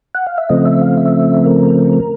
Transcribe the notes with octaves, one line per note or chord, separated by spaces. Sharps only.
F#5
F5
E5
C#3 F3 A3 C4 D#5
E5
F5
E5
A#4